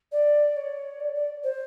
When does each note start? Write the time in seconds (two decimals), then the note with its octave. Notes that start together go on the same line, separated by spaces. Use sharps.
0.11 D5
0.56 C#5
1.00 D5
1.14 D5
1.43 C5